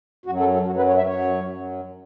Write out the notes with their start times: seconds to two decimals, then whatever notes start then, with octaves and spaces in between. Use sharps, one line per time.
0.26 F#2 F#4
0.30 F#3
0.40 A4
0.54 A4
0.66 F#2 F#3 F#4
0.77 B4
0.87 C#5
0.97 E5
1.07 F#2 F#3 C#5
1.48 F#2 F#3